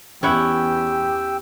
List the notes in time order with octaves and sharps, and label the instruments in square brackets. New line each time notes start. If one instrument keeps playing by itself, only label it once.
[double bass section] E2 [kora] C#4 E4 F#5 [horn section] G4 [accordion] G5 E6